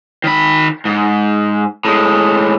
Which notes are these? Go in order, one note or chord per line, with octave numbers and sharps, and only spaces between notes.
D#3 B5
G#2
A2 G#3